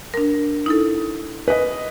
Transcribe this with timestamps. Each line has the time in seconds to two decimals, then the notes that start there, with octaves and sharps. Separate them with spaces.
0.14 D4 A#4
0.66 D#4 E4 A4
1.48 B4 D#5